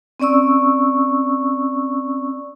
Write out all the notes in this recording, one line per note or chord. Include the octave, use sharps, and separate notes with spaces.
C4 C#4 D5 C#6 E6